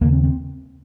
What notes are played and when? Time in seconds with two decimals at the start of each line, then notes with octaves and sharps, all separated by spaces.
0.01 D#2 C#3 A#3
0.13 C4
0.24 C4